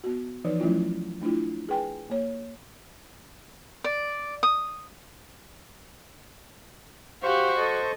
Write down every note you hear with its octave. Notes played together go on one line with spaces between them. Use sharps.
B3 F#4
E3 F3 D#4 B4 D5
F3 F#3 A3 C#4 E4 F4
A3 D4 E4 F4
G#4 B4 G5 G#5
A#3 C#5
D5
D#6
F#4 G4 C5 F5 C#6
A4 D#5